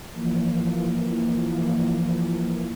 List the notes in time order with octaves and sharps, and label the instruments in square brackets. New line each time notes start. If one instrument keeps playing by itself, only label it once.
[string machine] E3 F3 A#3